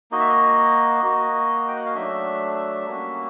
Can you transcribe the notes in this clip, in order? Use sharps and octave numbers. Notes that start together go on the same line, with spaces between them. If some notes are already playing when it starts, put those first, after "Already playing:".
A#3 D#4 F#4 D#5
E5
D#5
A#3 D#4 F#4
G5
F#5
F5
F#3 A3 D4 E5
G3 A#3 C#4 F#4